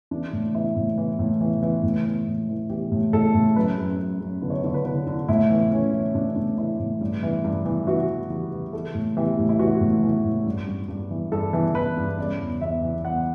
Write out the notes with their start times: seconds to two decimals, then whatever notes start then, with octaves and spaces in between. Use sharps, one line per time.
0.11 E3 D4
0.33 A2
0.54 E3 E4
0.76 A2
0.98 E3
1.19 A2
1.41 E3
1.62 E3
1.83 A2
2.06 E3
2.26 A2
2.49 E3
2.70 E3 G4
2.92 A2
3.13 A2 A4
3.35 A2
3.56 F#2 B4
3.78 F#2
3.99 F#2
4.21 F#2
4.42 D3 B4
4.50 C#5
4.59 B4
4.64 D3 C#5
4.74 B4
4.85 D3 B4
5.07 D3
5.28 A2 E4
5.50 E3
5.71 E3 C#4
5.93 E3
6.15 A2 D4
6.25 C#4
6.36 A2 D4
6.57 E3 E4
6.79 A2
7.01 G2
7.23 E3
7.44 G2
7.66 E3
7.87 E3 F#4
8.09 E3
8.30 E3 G4
8.52 E3
8.73 E3 A4
8.95 A2
9.17 E3 G4
9.38 A2
9.49 E4
9.59 E3 F#4
9.81 A2
10.03 E3
10.24 A2
10.46 G2
10.67 G2
10.89 G2
11.11 E3
11.32 G2 A4
11.53 E3
11.75 E3 B4
11.97 G2
12.18 C#3 D5
12.40 E2
12.61 E2 E5
12.82 E3
13.05 E2 F#5